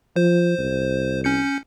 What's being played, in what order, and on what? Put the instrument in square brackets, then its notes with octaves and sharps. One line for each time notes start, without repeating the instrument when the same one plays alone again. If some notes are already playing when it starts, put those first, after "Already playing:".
[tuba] F3 [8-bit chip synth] C5
[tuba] C2
[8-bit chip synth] C#4 G6 C#7